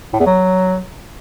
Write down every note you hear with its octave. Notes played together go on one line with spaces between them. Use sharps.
A2
E2
F#3